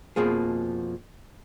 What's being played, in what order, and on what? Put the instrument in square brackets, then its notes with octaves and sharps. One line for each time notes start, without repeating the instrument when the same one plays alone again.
[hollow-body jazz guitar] F2 B2 F3 A#3 G#4